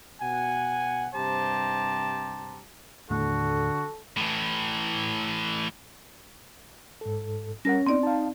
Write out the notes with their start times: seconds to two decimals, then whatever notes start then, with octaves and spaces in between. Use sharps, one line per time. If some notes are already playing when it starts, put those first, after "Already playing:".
0.21 B2 F#5 G#5
1.14 G2 C3 G4 C5 A5 A#5
3.10 D#2 A2 D3 A3 F#4 A4
4.17 A2 E3
7.01 G#2 A4
7.65 G3 C#4 A#4 F#5 A#6
7.87 B3 C4 D#4 D5
8.03 D#4 F5 A5